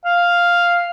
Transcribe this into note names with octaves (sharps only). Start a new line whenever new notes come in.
F5